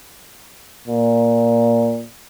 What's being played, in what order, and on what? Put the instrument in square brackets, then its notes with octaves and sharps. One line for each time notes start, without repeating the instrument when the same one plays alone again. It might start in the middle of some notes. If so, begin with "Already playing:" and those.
[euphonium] A#2